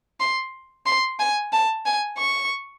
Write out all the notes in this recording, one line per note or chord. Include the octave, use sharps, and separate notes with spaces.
C6
C6
G#5
A5
G#5
C#6